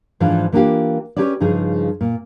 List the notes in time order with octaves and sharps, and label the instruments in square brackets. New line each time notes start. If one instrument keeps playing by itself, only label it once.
[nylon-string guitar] G#2 E3 F3 A3 D4 F4
E3 A#3 D4 D#4 F4 G4
C#4 E4 G4 B4 C#5 D5
G2 C#3 F3 D#4 G#4
A#2